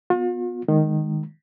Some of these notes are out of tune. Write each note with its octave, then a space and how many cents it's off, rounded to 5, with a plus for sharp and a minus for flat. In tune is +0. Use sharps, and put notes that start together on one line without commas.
B3 +0 F4 +45
D#3 -10 G#3 +0